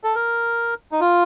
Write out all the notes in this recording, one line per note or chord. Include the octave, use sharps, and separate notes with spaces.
A4
A#4
D#4
F4